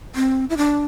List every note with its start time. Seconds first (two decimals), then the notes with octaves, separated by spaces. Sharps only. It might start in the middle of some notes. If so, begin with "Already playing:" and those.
0.15 C4
0.50 E4
0.57 D4